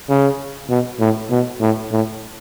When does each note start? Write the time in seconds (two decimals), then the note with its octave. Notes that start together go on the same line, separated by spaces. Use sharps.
0.09 C#3
0.70 B2
1.00 A2
1.31 B2
1.60 A2
1.91 A2